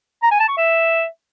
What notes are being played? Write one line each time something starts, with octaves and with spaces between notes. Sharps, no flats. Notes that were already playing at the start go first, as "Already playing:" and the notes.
A#5
G#5
A5
C#6
E5